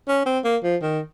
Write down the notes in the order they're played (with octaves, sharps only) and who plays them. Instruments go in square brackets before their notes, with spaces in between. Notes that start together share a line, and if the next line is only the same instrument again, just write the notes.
[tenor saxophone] C#4
C4
A#3
F3
D#3